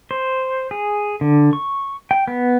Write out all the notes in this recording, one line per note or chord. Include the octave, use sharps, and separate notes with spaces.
C5
G#4
D3
C#6
G5
B3